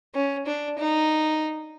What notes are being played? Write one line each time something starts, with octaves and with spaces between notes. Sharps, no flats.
C#4
D4
D#4